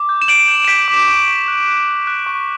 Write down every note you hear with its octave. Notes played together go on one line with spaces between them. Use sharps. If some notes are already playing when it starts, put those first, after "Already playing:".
Already playing: D6
G6
E7
G6 D7 F#7
G6
E7
G6 B6 D7
D6
C#6
C#6
F#6
F#6
F#6
F#6
C#6